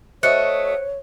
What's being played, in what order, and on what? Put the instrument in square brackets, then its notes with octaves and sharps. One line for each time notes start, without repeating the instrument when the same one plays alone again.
[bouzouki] A3 F#4 D#5 [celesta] C5 F#6 C#7 [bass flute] C#5